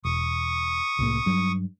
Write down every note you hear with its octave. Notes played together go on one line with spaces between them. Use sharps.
E1 C#6 D#6
C2 A2 A#3
G2 F#3